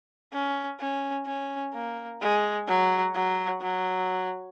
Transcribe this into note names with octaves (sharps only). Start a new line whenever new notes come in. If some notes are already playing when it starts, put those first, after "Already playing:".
C#4
C#4
C#4
A#3
G#3
F#3
F#3
F#3